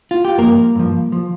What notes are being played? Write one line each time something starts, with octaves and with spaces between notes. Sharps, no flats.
F4
G4
G2 F3 A#3 A#4
G2 F3
F3